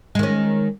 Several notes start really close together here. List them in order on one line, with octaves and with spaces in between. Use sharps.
G#3 D#3 C#4